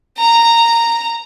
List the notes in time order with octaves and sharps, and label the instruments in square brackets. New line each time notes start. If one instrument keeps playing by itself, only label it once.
[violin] A#5